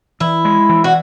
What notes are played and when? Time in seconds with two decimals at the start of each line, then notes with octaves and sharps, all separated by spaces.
0.20 E3 E4
0.45 G#3
0.69 E3
0.84 F#4